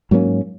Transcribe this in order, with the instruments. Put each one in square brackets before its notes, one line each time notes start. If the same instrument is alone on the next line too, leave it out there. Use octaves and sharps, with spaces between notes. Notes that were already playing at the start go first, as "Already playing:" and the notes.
[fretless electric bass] G#2 F#3 A#3 C#4